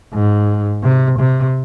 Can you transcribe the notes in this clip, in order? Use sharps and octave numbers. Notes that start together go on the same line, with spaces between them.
G#2
C3
C3